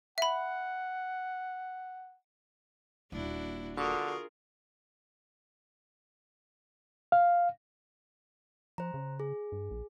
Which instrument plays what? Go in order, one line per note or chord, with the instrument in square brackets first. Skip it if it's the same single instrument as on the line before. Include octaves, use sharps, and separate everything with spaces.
[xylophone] E5 B5 [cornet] F#5
[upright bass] D#1 A#3 [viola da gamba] D4 E4 F#4
[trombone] D3 [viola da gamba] F4 G#4 A#4 [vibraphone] F#4 C#6 D#6
[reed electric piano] F5
[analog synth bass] F3 [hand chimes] C5 A#5
[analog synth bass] C#3
[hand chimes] G#4
[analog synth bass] G2
A#1